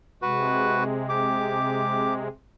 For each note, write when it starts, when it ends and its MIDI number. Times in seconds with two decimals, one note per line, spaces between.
0.22 2.28 48
0.22 2.28 56
0.22 0.84 66
0.22 0.84 71
1.09 2.14 67
1.09 2.14 86